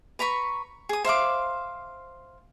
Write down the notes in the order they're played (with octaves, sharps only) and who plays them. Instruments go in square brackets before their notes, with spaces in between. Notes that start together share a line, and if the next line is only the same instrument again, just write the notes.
[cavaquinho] B4 A#5 B5 C#6
G#4 D#6
C5 E5 F5 D6